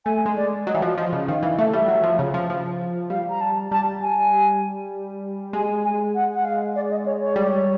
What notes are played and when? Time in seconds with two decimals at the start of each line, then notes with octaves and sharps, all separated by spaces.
0.05 A3 G#5
0.26 G#3
0.36 D5
0.67 F#3 D#5
0.74 E3
0.82 F3
0.97 F3 D#5
1.13 C#3
1.28 D#3 F5
1.43 E3 F5
1.58 A3 E5
1.73 G3 E5
1.88 F#3
2.03 F3
2.19 C#3
2.34 F3
2.50 F3
3.10 G3 F5
3.30 A#5
3.41 A5
3.71 G3 A5
4.02 G#5
5.53 G#3 G#5
5.85 G#5
6.15 F#5
6.34 F#5
6.45 F5
6.76 D5
6.91 D#5
7.06 C#5
7.21 C#5
7.35 G3 D5
7.48 C#5